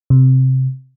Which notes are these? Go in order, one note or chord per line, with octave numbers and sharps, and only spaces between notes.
C3